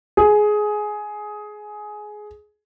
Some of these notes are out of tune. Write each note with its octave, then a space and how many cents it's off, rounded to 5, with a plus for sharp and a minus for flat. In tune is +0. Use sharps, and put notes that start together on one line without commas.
G#4 +15